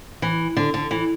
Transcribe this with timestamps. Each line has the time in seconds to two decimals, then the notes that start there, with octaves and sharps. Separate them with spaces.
0.22 E3
0.57 D3
0.74 D3
0.91 E3